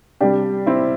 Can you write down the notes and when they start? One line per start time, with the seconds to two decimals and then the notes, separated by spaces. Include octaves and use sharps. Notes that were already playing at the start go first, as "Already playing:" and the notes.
0.21 C3 G3 D4 G4
0.66 C4 E4